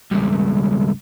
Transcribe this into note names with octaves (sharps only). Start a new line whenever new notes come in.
C#2 G2